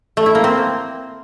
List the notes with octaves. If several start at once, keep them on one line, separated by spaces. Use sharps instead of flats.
A3
E4
A#3
C4